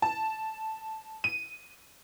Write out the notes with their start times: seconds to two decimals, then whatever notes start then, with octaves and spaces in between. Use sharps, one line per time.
0.02 A5
1.24 D#7